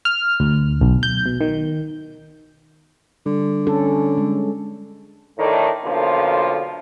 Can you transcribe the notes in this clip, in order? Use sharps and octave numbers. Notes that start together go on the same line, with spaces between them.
F6
D2
B1
G6
B2
D#3
D3 G3
C#4 A4
G#3
A2 D#3 A3 D4 D#4
B1 D3 F3 A#3 F4